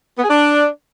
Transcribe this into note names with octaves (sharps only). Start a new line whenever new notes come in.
B3
G#4
D4